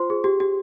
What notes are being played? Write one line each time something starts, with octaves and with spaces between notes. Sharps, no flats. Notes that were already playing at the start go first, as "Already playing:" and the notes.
Already playing: F4 C5 C6
G#4
G4
G4